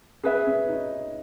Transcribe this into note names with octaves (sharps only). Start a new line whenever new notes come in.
C#4 G#4 B4 E5
C#4
D#4